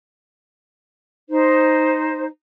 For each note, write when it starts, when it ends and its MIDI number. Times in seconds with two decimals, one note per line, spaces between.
1.29 2.24 63
1.29 2.24 72